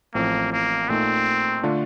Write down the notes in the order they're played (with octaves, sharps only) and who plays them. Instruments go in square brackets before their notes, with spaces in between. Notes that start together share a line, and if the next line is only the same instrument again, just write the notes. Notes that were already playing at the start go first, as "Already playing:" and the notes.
[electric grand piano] A1 A2 F3 C4 [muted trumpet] A#3
[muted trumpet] A#3
[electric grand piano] A#2 A3 D#4 [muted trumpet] C4
[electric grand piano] D3 A3 D4 F4